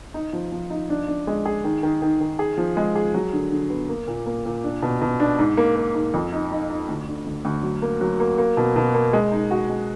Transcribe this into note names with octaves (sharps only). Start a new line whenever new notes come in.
D#4
F3
F3
D#4
D4
D4
G#3
G#4
D#3
D#3
D#3
D#3
G#4
F3
G#3
G#4
F#3
D3
D3
B3
A#3
A#2
A#3
A#2
D4
B2
B2
D4
G#2
A#3
A#3
G#2
F2
D#4
D#4
D#4
D2
D3
D2
D2
F#3
A#3
F#3
A#3
A#3
B2
B2
A#3
G#3
D#4
F#4
G#3